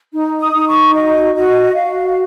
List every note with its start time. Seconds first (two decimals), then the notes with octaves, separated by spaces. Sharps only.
0.13 D#4
0.39 D#6
0.53 D#4
0.67 C#6
0.94 F#4 D#5
1.35 F#4 D#5
1.75 F#4 F5